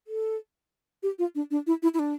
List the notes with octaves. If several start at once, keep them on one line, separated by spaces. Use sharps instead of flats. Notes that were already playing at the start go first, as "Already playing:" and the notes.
A4
G4
F4
D4
D4
E4
E4
E4
D4